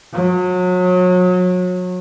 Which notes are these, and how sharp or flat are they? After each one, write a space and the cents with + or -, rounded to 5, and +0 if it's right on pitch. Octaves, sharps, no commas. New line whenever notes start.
F#3 -30